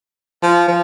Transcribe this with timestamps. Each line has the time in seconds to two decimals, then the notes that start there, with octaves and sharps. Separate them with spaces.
0.42 F3
0.68 F3